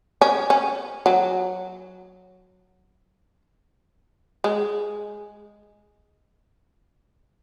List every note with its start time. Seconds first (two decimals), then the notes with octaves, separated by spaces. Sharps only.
0.21 C#4
0.50 C#4
1.06 F#3
4.44 G#3